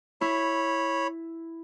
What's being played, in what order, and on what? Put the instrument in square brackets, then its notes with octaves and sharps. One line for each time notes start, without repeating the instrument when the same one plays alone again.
[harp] E4 [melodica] C#5 B5